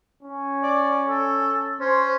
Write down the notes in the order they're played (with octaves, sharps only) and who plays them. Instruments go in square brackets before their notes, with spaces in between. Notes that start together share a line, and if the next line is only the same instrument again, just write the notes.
[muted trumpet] C#4
[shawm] D5
A4
[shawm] C#4 [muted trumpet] C5